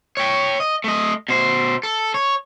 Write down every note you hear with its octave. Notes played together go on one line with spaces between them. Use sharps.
C#5 G5
D#5
A3 D#5
B2 C5
A4
C#5